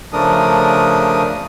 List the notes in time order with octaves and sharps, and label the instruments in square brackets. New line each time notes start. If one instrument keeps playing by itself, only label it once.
[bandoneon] C#3 F3 A3 D4 A#4 D#6